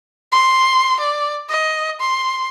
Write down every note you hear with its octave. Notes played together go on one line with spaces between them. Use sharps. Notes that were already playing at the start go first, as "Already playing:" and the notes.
C6
D5
D#5
C6